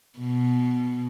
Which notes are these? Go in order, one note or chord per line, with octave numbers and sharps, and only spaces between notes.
B2